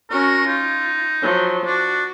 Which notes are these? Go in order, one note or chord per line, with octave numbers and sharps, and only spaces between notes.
C#4 F#4 A#4
D#4 F4
F3 F#3
D4 F#4